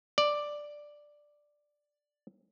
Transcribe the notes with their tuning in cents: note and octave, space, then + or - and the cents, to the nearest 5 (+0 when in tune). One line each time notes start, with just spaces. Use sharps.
D5 +5